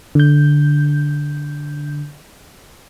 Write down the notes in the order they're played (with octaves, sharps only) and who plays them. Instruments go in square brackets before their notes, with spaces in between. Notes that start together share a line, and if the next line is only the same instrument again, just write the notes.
[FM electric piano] D3 G6